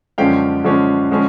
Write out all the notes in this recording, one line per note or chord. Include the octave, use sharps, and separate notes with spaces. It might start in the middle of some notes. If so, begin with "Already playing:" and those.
F#2 D3 F3 G#3 C#4 F5 G5
F#2 D3 F3 G#3 C#4
D3 F3 G#3 C#4